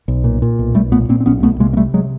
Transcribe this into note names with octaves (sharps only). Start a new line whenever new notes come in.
B1
A#2
A#2
B1
B1 G3 A3
A#2 A3 B3
A#2 A#3 C4
C4
B1 B3 C#4
C2 A3 B3
C3 G#3 A#3
A#3
C3 G3 A3
F#3 G#3